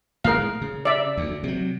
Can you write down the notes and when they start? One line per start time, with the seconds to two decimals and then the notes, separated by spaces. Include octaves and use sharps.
0.25 A2 G3 G#3 A#4 F5
0.61 C#3
0.85 D5 E5
1.17 D2
1.44 C3 F#3